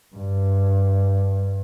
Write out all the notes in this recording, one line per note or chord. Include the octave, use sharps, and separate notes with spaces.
G2